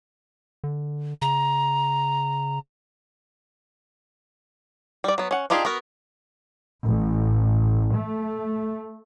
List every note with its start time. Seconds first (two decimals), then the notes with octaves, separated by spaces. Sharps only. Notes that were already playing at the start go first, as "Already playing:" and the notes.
0.64 D3
1.22 C#3 A#5
5.04 G3 D5
5.18 F#3 B3
5.31 C#4 F#5
5.50 D4 D#4 F4 G4 G#4
5.65 B3 F#4 A#4
6.86 A1
7.93 A3